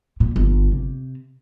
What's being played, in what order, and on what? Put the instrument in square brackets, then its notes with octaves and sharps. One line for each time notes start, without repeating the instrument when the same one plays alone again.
[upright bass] A#2
G1
C3